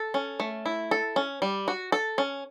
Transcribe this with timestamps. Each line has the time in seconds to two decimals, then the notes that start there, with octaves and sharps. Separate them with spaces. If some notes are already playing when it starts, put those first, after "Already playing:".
Already playing: A4
0.14 C#4
0.40 A3
0.66 E4
0.91 A4
1.16 C#4
1.42 G3
1.68 F#4
1.92 A4
2.18 C#4